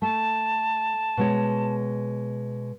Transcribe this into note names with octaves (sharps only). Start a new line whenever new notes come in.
A3 A5
B2 G#3 C#5